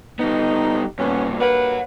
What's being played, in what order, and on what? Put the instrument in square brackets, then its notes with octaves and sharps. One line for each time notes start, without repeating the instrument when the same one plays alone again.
[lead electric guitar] G3 B3 [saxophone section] D#4
[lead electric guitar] G2 A#2 [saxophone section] B3 C#4
[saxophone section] G2 A#3 B4 [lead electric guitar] C#5 F#5